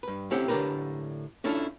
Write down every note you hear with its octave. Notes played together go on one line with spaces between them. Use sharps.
G2 B4
A3 C4 C#4 E4 G4 F#5
A2 D3 D4 G4 A#4 B4
C#4 D4 E4 F4 A4